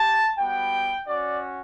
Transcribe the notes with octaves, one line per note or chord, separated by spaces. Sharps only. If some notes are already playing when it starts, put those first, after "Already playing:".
Already playing: G4 A5
G3 B3 F#4 G5
C#4 F#4 D5